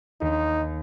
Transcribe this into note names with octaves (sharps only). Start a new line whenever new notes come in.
D#2 D#4